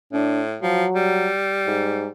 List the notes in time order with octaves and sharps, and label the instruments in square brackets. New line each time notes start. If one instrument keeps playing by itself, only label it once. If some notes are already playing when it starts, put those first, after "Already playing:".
[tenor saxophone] A2 [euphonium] D4
[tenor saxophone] F3 [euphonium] F#3
[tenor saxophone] G3
[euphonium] G#2